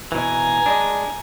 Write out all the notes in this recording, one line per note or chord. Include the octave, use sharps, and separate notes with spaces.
B2 E3 G#5 A#5
G#3 D4